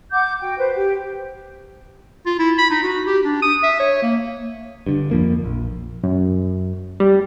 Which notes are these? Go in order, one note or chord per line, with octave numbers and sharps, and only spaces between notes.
F#5 D6 G6
F#4 G5
B4 C5
G4
F4
E4
B5
D#4
F#4
G4
D4
D#6
E5
C#5
A#3
G2 D3
F2 F3 A#3
A#1
F#2
G3